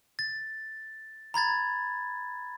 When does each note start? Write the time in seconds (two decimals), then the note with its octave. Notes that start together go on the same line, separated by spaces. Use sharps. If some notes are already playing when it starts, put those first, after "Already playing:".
0.19 A6
1.34 A#5 B5 G#6 A6